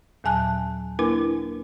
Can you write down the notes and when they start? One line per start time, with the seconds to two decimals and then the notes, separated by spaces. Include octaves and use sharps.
0.24 D#2 A#2 F#3 G#5 A5 F#6
0.99 A#3 D4 E4 A#4 B4